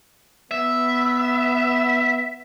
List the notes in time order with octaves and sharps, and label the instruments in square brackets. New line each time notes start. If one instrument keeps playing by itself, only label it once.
[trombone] B3 [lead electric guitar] E5